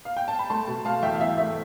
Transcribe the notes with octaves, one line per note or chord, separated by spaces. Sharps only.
F5
G5
A5
B5
A3 A5 C6
B2
A3 F5 A5
E2 E5 G5
F5
E3 E5
A3 E5